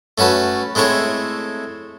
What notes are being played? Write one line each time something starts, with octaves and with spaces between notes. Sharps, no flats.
A3 C#4 F#4 B4 A5
G#3 A3 C4 E4 C#5